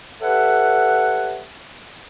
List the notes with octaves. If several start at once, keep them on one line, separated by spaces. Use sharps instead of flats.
G4 A4 B4 C#5 E5 F#5